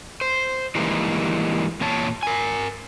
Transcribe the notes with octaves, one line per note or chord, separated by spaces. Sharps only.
C5
E3 G3 G#3 A#3 D#4
E2 A#2 C#5 A5
A#4 G#5